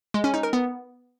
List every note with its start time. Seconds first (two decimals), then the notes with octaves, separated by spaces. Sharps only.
0.14 G#3
0.24 C#4
0.34 D#4
0.43 A#4
0.53 B3